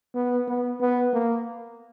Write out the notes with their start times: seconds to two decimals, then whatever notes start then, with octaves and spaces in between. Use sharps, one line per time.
0.15 B3
0.48 B3
0.81 B3
1.13 A#3